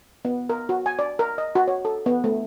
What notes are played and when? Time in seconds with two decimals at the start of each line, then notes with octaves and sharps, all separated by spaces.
0.25 B3
0.49 A#4
0.69 F#4
0.86 G#5
0.99 D5
1.19 A#4
1.38 D#5
1.55 F#4
1.68 C#5
1.85 A4
2.06 B3
2.24 A3